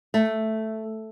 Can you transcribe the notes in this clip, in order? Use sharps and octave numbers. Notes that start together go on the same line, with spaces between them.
A3